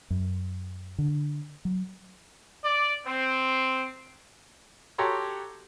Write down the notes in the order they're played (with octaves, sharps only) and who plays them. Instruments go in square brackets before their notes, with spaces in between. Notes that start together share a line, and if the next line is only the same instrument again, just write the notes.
[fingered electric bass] F#2
D3
F#3
[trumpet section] D5
C4
[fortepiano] F#4 G4 A4 C#5 A#5 C6